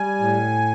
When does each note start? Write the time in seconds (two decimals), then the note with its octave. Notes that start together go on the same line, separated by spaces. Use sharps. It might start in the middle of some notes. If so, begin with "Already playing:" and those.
Already playing: G3 G#5
0.20 A2